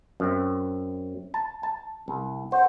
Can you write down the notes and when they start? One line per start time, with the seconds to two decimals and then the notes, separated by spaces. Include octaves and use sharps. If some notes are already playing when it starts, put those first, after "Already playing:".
0.20 F#2 C4
1.34 A5
1.63 A5
2.08 C2
2.52 C5 F#5